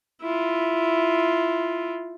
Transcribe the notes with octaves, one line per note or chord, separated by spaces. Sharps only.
E4 F4